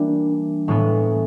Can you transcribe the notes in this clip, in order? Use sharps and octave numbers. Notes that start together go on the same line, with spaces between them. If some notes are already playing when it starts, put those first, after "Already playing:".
Already playing: E3 G3 A#3 D4
A2 E3 G#3 B3